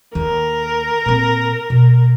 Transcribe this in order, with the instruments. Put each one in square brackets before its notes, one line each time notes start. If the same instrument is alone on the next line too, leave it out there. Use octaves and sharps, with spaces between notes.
[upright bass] D#2 [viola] A#4
[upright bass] A#2 C4
B2